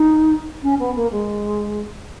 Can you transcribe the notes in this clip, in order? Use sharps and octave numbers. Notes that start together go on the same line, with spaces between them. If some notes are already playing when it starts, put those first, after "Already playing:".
Already playing: D#4
C#4
B3
A#3
G#3